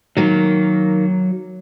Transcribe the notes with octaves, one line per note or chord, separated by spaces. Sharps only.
D#3 F#3 A#3